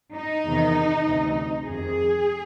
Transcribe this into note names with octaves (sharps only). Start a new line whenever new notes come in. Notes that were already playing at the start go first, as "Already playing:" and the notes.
D#4
E2 C3 D#3
D2 C3 E3
F2 C3 D#3 G#4